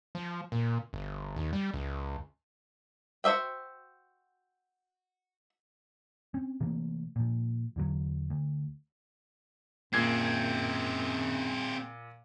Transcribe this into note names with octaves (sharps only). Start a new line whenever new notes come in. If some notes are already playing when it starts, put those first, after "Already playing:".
F3
A#2
G1
D#2
G3
C#2
F#4 C5 D#5 E5 G5
C4 C#4
C3 E3 A3 A#3
A#2 F3
E2 D3 F#3
D2
F#2 A#2 C4 G#4 G#6 C7